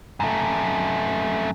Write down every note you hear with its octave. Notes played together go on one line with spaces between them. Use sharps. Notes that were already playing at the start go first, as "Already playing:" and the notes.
F#2 A3